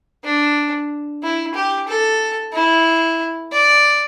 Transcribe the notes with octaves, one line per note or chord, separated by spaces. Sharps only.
D4
E4
G4
A4
E4
D5